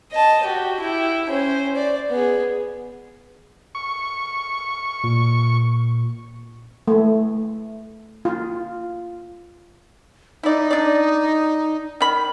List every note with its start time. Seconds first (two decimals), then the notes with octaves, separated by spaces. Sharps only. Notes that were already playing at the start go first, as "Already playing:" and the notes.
0.12 D#5 A5
0.44 F#4 G4
0.80 E4 G4
1.30 C#4 C5
1.76 D5
2.10 B3 G#4
3.75 C#6
5.04 A#2
6.87 A3
8.25 F4
10.43 D#4 E4 D5
10.71 D4 D5
12.01 D#3 B5